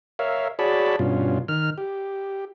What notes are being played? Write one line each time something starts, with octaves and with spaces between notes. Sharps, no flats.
A#4 C#5 E5 F5
F#4 G#4 C#5 D5 A5 B5
G2 B2 C#4 F4
D#3 F6
G4